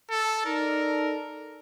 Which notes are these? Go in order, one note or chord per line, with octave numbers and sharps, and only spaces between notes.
A4
D#4 A4 A#4 D5